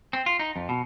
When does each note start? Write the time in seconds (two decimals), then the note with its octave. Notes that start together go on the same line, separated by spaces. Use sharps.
0.13 C4
0.26 F4
0.39 D#4
0.56 F2
0.69 B2